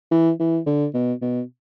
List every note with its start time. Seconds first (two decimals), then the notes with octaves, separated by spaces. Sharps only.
0.11 E3
0.40 E3
0.66 D3
0.94 B2
1.22 B2